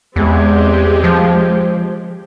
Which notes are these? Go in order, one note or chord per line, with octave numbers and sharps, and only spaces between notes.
E2 G#3 C4 G4
F3